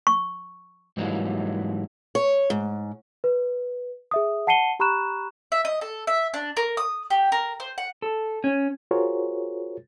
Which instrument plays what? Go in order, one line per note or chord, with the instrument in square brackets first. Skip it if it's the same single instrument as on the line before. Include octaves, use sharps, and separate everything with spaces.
[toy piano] C#6
[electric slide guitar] G#2 E3 F#3 G3 A#3
[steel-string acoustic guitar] C#5
G#2
[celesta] B4
G#4 E5 D#6
F#5 A5 C7 C#7 D#7 G7
G4 A#5 B5 C#6 F#6 E7
[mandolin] E5
D#5
A4
E5
D4
A#4
D#6
G4
A#4
C5
F#5
[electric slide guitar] A4
C#4
[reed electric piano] F4 F#4 G#4 A#4 C5 C#5